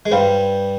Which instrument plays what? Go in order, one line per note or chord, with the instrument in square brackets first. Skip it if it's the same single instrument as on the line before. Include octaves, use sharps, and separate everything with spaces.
[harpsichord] G#3
[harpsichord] G2 G3 [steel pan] C5 F5 B5